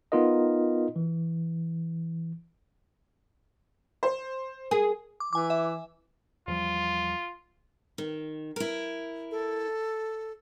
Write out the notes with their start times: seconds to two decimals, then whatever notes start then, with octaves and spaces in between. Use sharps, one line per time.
0.12 B3 D#4 F4 A#4 D#5
0.96 E3
4.03 C5
4.71 G#4 A#4
5.20 D6
5.33 E3 G#5 D6
5.50 E5
6.47 E2 F3 G3 F4
7.98 D#3
8.56 E4 A#4
9.31 A4